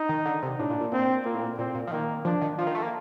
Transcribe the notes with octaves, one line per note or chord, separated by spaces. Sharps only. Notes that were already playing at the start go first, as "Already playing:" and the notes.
Already playing: D#4
D#3
D3
C3
A2 D4
A#2
A#2
A#2 C4
A#2 A#3
A2
A#2
A#2 C4
A#2
F3
D#3 A#3
F3 D4
D#3
F3 F4
D#3
A3
A#3